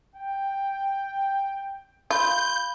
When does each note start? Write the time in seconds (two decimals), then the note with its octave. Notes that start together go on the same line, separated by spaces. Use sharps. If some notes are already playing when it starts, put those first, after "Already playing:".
0.16 G5
2.10 F4 B5 G6